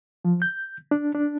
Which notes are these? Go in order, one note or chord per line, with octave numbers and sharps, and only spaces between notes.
F3
G6
D4
D4